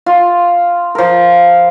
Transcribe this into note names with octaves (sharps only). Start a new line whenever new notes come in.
F4
F3 A#4